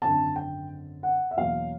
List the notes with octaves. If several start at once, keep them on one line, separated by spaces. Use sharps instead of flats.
G#1 F#2 D3 A5
G5
F#5
E5
E2 B2 F#3 A#3 C#4 F5